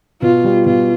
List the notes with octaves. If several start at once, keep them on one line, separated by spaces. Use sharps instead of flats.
B2 F4
G3
B2 F4